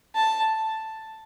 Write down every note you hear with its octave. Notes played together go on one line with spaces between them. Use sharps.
A5